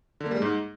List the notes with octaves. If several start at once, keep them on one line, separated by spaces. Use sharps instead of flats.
D3
A#3
G3
G#3
G#2